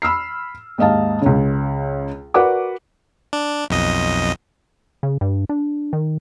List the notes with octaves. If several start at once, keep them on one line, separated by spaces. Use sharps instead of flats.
B5 E6 F6 C7
D#2 G#2 D#5 F5 A5
C#2 C#3
F#4 A#4 B4 D5 F#5 D6
D4
B1 F2 D#5
C#3
G2
D4
D#3